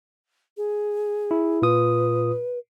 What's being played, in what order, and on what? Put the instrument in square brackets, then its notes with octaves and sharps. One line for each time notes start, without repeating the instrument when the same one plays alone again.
[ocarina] G#4
[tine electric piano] E4
[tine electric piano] A#2 F4 D#6 [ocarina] B4